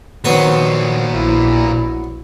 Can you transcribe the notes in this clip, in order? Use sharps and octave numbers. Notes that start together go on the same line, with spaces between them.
A#2 D#3 F#3 B3 B4 C5
A#1 E4